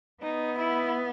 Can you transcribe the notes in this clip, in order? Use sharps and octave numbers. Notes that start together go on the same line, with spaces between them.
B3 D#4
E4